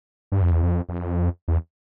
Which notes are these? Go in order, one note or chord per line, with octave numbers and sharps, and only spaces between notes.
G2
F2
E2
F2
F2
E2